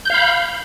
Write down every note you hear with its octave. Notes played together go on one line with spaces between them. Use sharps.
F5 B5 G6